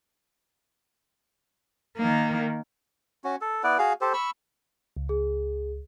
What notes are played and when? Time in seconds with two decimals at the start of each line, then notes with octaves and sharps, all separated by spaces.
1.97 D#3 A#3
3.24 C#4 F#4
3.41 A4
3.64 B3 E4 B4 D5
3.79 F#4 G#4 F5
4.01 G4 A4 C5
4.13 B5 C#6 E6
4.97 C#2
5.09 G#4